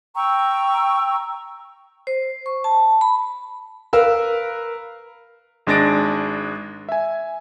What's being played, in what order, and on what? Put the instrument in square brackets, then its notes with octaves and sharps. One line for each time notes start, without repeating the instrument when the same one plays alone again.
[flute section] G5 A#5 C#6 E6
[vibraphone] C5
C#6
A5
B5
[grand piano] A#4 B4 F5 E6
[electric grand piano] G#1 G#3 D4 A6 A#6 D7
E5 G#5